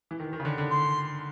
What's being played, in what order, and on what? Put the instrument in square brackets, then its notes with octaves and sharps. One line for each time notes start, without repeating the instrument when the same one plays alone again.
[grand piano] E3
D#3
D#3
C#3
D3
D3
[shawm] C6